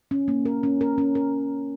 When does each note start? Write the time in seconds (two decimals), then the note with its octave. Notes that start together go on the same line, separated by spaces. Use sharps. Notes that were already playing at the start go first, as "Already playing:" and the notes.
0.11 C#4
0.28 A#3
0.45 A#4
0.63 C#4
0.81 A#4
0.98 C#4
1.15 A#4